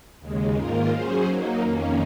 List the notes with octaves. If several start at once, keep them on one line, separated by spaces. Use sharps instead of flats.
D#2 C#3 G#3
G#2 D#3 A#3 F4 A#4
F#3 C#4 G#4 C5
F#3 A#3 D#4
F2 D#3 A#3 C#4